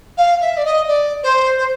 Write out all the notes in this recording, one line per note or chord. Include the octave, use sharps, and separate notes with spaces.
F5
E5
D5
D#5
D5
C5
C5